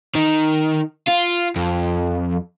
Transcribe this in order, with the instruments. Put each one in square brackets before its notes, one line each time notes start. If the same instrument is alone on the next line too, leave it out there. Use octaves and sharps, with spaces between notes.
[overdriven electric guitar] D#3
F4
F2